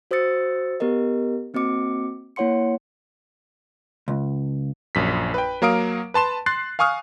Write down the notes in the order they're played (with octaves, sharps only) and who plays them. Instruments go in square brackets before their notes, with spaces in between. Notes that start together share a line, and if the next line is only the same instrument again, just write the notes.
[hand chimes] F#4 C5 D#6 E6 A6 C#7
B3 G4 A#4 D#5
A#3 C4 F#4 D#5 D6 C#7
A#3 E4 C#5 F#5 C6 C#7
[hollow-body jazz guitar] C#2
[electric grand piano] A#1 F#2 B6
B4 G5
F#3 A#3 A#4 F5 D#6 D7
B4 A5 C6 E7
C6 F#6 A6 C7
F5 G#5 C#6 D#6 F6